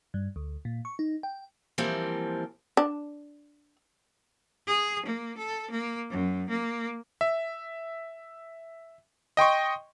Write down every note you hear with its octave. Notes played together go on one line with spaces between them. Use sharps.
G2
D2
A#2
C#6
D#4
G5
E3 F3 G3 A#3 C4
D4
G#4
A#3
A4
A#3
F#2
A#3
E5
D#5 G5 C6 C#6